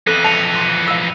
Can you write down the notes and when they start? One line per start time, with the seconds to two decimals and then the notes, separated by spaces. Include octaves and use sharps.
0.07 F2 E3 A4 F#6 D#7
0.24 A5 C#7 D#7 F7
0.55 C6
0.88 F5 E6